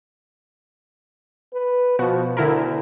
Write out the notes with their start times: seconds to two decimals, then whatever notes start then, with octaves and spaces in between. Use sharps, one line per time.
1.54 B4
1.99 B2 F3 B3 F#4
2.37 D2 D3 E4 A#4